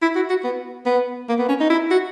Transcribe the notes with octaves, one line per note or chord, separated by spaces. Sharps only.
E4
F#4
F#4
B3
B3
A#3
B3
C#4
D#4
E4
F#4